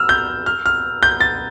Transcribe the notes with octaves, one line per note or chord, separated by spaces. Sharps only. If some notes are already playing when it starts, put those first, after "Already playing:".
Already playing: E6 F6
G6
F6
F6
G6
A6